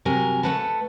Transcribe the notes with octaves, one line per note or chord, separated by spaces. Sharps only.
C3 F#3 A#4 G#5
A3 A4 B4 F#5 A5